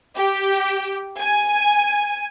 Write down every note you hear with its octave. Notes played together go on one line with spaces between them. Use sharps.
G4
G#5